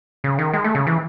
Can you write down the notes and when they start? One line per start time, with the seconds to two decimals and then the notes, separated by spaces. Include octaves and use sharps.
0.24 C#3
0.39 D#3
0.53 G#3
0.64 A3
0.75 C#3
0.87 E3